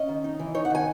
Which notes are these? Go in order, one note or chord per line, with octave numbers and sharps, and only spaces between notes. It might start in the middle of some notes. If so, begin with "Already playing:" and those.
Already playing: C#4 D#5
D#3
D#4
E3
D#4 C#5
F#5
D#3 G#5